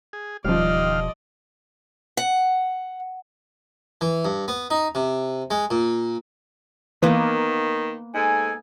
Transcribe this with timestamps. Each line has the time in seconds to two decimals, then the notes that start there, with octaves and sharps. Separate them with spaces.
0.13 G#4
0.45 E1 D#2 F3 G3 D5 D#5 F5
2.17 F#5
4.01 E3
4.25 G2
4.48 B3
4.70 D#4
4.95 C3
5.51 G#3
5.71 A#2
7.03 D#3 E3 A#3 B3
8.14 G#2 D#4 A4 G#5